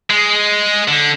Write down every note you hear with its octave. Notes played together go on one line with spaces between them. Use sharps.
G#3
D3